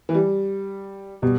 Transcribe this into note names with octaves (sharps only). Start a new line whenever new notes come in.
E3
G3
B2 G3